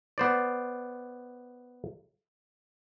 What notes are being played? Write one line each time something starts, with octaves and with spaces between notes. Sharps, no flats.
B3 C5 D5